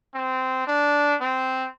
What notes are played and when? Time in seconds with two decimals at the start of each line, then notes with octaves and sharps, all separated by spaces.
0.15 C4
0.67 D4
1.21 C4